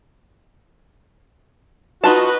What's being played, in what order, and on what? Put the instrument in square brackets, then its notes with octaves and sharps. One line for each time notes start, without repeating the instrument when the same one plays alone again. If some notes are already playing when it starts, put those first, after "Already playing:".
[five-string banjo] D#4 F4 A5 [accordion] F#4 [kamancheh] B4 D#5